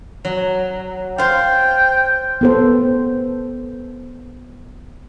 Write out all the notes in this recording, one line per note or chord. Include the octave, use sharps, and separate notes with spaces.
F#3
F4 C5 G5
B3 A4 C5